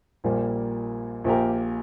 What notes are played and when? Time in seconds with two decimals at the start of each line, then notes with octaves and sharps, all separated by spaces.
0.24 A#1 A#2 G3 A#3
1.24 A#1 A#2 A#3 G4 A#4